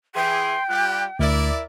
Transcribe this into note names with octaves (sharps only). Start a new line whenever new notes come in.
E3 G#4 G5 C6
G3 F4 G4 F#6
D2 E4 A#4 D5 E5